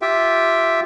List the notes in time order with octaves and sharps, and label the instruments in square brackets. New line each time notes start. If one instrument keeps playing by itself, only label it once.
[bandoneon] F4 G4 E5 G5